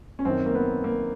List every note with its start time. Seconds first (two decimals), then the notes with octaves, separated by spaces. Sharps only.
0.19 C#4
0.25 F#2 D#3 C4
0.46 A#3
0.55 B3
0.84 A#3